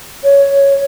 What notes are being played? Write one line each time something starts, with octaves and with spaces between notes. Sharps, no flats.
C#5